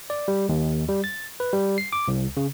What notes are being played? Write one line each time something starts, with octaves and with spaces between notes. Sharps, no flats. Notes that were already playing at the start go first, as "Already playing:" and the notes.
D5
G3
D#2
G3
A6
B4
G3
C7
D6
C2
C#3